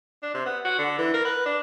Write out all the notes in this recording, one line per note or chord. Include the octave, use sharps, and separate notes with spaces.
D4
C3
B3
F#4
D3
E3
A#4
B4
D4